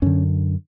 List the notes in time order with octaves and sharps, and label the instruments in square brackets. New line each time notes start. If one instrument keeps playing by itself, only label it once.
[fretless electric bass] F#2 D3 C#4